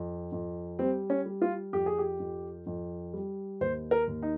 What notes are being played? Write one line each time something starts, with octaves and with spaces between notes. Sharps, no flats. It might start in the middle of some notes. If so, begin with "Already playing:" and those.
Already playing: F2
F2
G3 C4
C#4
G3
F4
F2 G4
G#4
G4
F2
F2
G3
D#2 C5
A#4
D#2
D#4